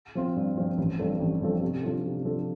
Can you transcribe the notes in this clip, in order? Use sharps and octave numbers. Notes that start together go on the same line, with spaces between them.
F3 C4 F4
G2
F3 C4 F4
A1
G2 F3 C4 A4
A1
G2 F3 C4 A4
C3
F3 D4 F4 A4
C3
F3 D4 F4 A4